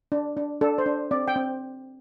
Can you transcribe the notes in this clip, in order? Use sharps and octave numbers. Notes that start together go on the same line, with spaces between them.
D4
D4
D4 A4
C5
D4
C4 D5
G5
C4